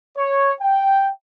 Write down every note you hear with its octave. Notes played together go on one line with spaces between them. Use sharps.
C#5
G5